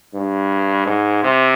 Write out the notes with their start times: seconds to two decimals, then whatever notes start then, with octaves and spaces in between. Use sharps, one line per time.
0.14 G2
0.86 G#2
1.23 C3